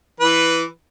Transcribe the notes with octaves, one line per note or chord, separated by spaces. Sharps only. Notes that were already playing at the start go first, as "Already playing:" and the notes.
E3 B4